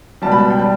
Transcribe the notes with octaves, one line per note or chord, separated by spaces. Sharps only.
C#2 B2 G3 A5
B5
A5
G5
G3 A5